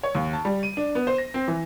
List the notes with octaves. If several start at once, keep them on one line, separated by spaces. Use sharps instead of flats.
C#5
D#2
A5
G3
D#7
D4
B3
C5
A#6
C4
E3